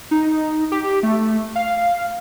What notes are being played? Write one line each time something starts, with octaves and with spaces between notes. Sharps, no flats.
D#4
G4
A3
F5